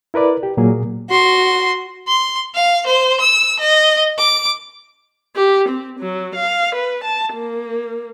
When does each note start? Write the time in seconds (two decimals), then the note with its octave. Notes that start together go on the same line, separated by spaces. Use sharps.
0.14 E4 A#4 B4 D5
0.43 G4
0.57 A#2 F#3 A#3 G#4
1.10 F#4 C6
2.08 C6
2.55 F5
2.87 C5
3.21 E6
3.60 D#5
4.18 D6
5.36 G4
5.69 C4
6.00 F#3
6.35 F5
6.75 B4
7.04 A5
7.34 A#3